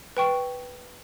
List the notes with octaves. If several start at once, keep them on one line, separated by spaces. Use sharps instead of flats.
B4 G5 C#6